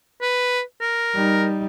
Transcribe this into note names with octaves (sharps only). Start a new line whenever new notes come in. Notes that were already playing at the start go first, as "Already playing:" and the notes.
B4
A#4
G3 D#4